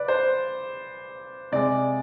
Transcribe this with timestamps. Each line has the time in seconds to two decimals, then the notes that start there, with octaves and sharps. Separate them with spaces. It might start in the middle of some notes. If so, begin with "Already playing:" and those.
Already playing: B4 D5
0.08 C5
1.52 C3 G#3 D5